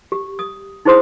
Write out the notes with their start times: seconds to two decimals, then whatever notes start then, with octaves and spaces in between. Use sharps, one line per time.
0.12 G4
0.39 D#6
0.85 D#4 E4 G#4 C5 C6 D#6